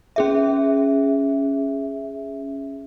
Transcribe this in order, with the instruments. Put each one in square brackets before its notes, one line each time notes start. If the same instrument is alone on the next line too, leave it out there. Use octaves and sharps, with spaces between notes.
[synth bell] C#4 G#4 E5